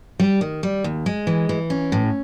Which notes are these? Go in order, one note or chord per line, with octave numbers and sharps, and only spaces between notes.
G3
D#3
G3
D#2
G#3
E3
E3
C#4
A2